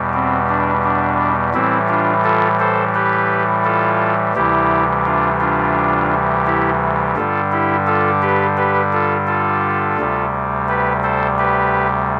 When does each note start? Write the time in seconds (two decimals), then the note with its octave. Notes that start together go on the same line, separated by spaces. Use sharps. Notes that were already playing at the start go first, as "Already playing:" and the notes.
Already playing: E2 B2 G3
0.14 C4
0.49 D4
0.84 D4
1.54 A2 E3 G3 C4 E4
1.89 D4 F4
2.24 F4 A4
2.60 A4 C5
2.94 G4 B4
3.65 F4 A4
4.35 D2 C3 E3 G3 E4 G4
5.05 D4 F4
5.40 D4 F4
6.46 E4 G4
7.16 G2 D3 G3 F4 A4
7.52 E4 G4
7.87 F4 A4
8.22 G4 B4
8.57 G4 B4
8.93 F4 A4
9.27 F4 A4
9.98 D2 C3 G3
10.68 G4 B4
11.03 A4 C5
11.38 G4 B4